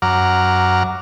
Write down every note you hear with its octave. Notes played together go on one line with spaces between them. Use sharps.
F#2 F#5 A#5 D6 F6